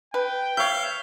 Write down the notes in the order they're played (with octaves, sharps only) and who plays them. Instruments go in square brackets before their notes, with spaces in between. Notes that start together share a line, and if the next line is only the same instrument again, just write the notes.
[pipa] B4 [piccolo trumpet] G5
[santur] C#5 E5 [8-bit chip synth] F5 G6